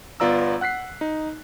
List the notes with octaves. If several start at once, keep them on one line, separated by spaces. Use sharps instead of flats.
G1 B3 F4 D5 A#5 E6
F#5 F#6 B6 C7
D#4